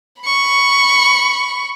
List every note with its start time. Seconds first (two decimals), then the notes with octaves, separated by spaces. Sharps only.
0.22 B5 C#6